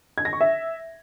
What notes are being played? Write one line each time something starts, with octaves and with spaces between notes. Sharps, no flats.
G#6
A#6
C#6
E5